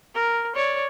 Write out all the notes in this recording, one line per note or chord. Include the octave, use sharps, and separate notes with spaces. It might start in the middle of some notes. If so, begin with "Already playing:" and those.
A#4
C#5 D5